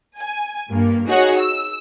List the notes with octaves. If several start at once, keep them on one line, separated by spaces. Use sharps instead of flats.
G#5
G2 A#3
D#4 F#4 G#4 C#5 F#5
E6